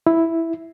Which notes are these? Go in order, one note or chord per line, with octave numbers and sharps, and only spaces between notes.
E4